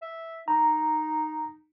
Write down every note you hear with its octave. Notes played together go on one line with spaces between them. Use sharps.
E5
D#4 A#5